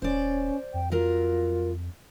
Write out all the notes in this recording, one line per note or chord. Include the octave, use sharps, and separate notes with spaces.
D#1 C#4 C5 D5
F2 G5
F#3 F4 A#4